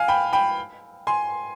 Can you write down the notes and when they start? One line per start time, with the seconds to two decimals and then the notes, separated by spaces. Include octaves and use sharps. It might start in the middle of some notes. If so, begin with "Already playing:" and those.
Already playing: F5 G#5
0.08 G5 B5
0.33 G5 B5
1.07 G#5 C6